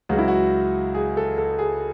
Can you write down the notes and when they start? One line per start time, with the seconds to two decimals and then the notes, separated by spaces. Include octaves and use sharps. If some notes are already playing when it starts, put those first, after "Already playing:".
0.09 C#2 C#3 F#3 F#4
0.18 E4
0.28 F#4
0.95 G#4
1.17 A4
1.38 A4
1.59 G#4